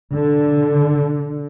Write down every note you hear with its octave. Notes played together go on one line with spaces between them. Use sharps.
D3